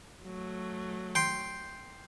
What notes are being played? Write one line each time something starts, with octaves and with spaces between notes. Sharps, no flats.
F#3 A3
G5 C6